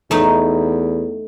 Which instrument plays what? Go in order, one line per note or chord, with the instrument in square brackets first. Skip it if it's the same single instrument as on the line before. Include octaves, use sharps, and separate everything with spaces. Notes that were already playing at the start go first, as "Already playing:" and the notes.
[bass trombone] E2 [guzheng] A3 D#4